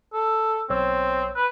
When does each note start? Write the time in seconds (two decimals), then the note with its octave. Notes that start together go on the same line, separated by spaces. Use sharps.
0.14 A4
0.70 B1 C4 C#5 E6
1.36 B4